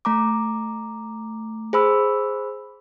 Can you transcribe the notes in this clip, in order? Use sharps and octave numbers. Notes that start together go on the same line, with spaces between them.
A3 A#5 D6
G#4 C5 B5 E6